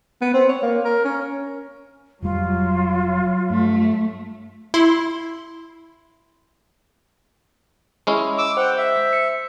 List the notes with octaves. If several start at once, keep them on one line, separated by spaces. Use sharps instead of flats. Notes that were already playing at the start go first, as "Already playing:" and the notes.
B3
C4
C#5
A#3
A#4
C#4
F1 F#3 G3 F4
G2 A3
E4 C6
G#3 C#4 E4
D6 E6
C5 F#5 G5
E5
C#7